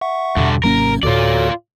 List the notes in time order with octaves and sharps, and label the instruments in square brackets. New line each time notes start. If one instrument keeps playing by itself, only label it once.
[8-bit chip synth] E5 F#5 C#6
[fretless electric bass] E2 B2 [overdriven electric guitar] G2 D3
[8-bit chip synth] G#1 G#2 C3 [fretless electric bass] F#3 A#3 C#4 [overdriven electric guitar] A#4
[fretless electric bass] D2 A2 [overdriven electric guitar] F4 D5 [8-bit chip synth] F#4 A4 C#5